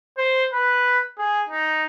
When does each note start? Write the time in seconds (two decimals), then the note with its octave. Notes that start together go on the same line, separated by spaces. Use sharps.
0.18 C5
0.53 B4
1.18 G#4
1.49 D#4